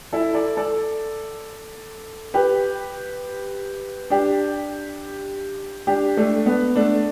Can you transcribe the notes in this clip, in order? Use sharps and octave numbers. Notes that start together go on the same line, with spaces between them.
E4 A4
A4 D5
A4 D5
G4 B4
D4 G4
D4 G4
A3 D4
B3
A3 D4